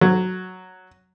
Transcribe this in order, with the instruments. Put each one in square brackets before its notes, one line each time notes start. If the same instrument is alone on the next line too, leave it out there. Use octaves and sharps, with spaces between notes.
[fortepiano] F#3